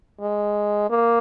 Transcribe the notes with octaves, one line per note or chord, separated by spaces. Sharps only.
G#3
A#3